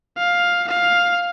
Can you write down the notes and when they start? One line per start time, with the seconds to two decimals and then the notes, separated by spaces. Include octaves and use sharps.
0.17 F5
0.68 F5